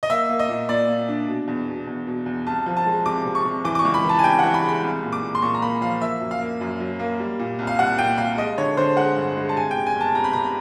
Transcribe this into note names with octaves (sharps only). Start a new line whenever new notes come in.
D#5
A#3 E5
A#3
D#5
A#2
A#2 D5
A#2
D4
B2
E2
B2
E2
B2
E2
C2 A5
F3
A5
G#3
C3 D6
C3
C#6
C3
E3 D6
D6
C#6
C#2
B5
E3 A5
G#5
C3 G5
E3 F#5
B5
G#3
B5
C2
A#2
D6
A#2
C6
A#2 C#6
A#5
A#3 B5
F3 F5
A#3 E5
F#2
F5
A#3
F#2
F#3
A#3
G3
A#2
C2
F5
C2 F#5
A#2 G5
C2 F5
G#3 D#5
D3 C#5
D3 C5
G#3 F#5
G2
G#3
A5
C3 G#5
G5
C3
G#5
G1 A5
C3 A#5
B5
C3 A#5